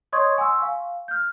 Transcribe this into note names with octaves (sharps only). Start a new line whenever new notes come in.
C#5 D#5 C6 C#6 D#6 G#6
F#5 G#5 C6 C#6 E6
F5
F6 G6